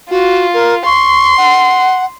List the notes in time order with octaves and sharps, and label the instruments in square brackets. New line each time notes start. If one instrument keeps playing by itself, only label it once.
[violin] F4 [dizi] F#4
[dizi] A#4
[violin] C6 [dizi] C#6
[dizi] F#5